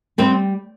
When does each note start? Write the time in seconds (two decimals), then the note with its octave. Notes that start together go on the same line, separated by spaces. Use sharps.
0.18 G3 C4